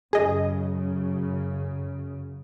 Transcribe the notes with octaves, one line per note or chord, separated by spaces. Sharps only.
F#2 C#3 G#4 D#5